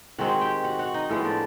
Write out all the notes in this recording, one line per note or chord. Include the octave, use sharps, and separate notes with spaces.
D#3 G#3 C4 F#4 F#5
G4 G5
F#4 F#5
F#4 F#5
D#4 D#5
A2 F3 G#3 B3
D4 D5